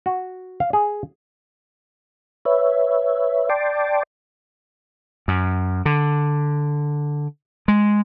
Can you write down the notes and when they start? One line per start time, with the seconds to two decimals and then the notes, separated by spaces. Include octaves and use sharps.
0.06 F#4
0.60 F5
0.73 G#4
2.45 B4 C#5 E5
3.50 D5 G5 A5 C6 D6
5.28 F#2
5.86 D3
7.68 G#3